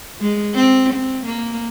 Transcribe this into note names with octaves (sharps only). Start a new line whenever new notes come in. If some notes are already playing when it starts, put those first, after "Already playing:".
G#3
C4
C4
A#3